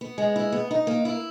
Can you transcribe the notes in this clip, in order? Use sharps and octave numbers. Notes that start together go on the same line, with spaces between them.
B3
G#3
E4
B3
D#4
A#3
E4